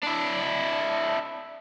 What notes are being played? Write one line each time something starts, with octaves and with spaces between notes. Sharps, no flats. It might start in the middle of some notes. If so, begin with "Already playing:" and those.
D4 E4